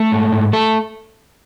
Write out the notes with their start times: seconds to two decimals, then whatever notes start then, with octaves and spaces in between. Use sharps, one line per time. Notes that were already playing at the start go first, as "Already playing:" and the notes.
Already playing: A3 A4
0.12 G#2
0.32 G#2
0.53 A3 A4